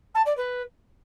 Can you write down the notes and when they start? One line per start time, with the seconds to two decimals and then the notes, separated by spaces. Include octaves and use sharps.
0.14 A5
0.25 D5
0.37 B4